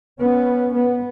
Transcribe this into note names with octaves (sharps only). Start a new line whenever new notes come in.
B3 C#4
B3